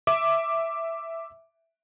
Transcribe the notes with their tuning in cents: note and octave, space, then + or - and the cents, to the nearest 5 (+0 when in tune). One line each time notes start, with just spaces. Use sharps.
E5 +0 D6 +0